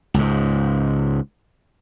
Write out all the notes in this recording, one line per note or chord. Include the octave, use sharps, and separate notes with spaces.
C#2 G#2